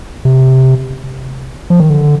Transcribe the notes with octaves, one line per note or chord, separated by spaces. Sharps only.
C3
F3
D#3
D3